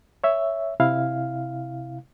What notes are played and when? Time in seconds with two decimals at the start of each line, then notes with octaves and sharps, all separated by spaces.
0.24 C#5 E5
0.80 C3 E4 F5